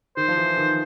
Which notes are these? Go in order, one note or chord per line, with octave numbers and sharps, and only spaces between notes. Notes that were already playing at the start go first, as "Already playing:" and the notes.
D#3 C5
F3
E3
D#3